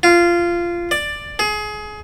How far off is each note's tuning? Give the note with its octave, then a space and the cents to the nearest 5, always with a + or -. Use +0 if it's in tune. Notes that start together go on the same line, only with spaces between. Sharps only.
F4 -15
D5 +10
G#4 +25